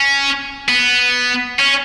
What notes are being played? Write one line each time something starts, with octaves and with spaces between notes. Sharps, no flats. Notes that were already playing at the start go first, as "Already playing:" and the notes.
Already playing: C#4
B3
C#4